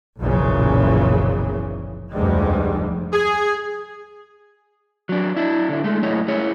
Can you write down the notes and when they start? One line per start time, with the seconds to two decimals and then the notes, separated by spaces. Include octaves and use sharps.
0.20 F#1 B1 A#2 C#3 E3 F3
2.12 F1 D2 G2 G3 G#3
3.12 G#4
5.09 F#3 D4
5.36 D4 E4
5.69 D3 E4
5.84 G#3 A3
6.03 F#2 A3 E4 G#4 C#5 D#5
6.28 E4 G#4 C#5